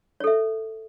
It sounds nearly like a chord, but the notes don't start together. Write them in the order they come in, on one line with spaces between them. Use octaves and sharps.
C#5 A4 E5